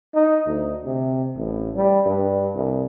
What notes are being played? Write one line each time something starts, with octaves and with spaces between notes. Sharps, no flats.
D#4
D2
C3
A1
G3
G2
C2